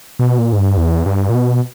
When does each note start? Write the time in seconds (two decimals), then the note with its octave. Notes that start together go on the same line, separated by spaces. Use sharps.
0.19 B2
0.39 A#2
0.53 G#2
0.58 G2
0.77 E2
1.06 G2
1.29 A#2
1.35 B2